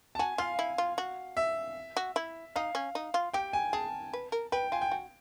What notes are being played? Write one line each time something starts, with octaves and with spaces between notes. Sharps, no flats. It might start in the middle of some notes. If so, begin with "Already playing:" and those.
A5
F#4 G#5
F4 F5
E4
F4
F#4
E5
F#4
E4
D#4 F5
C#4
D#4
F4
G4 G5
G#5
G#4 A5
B4
A#4
B4 G5
F4 G#5
G5
F#4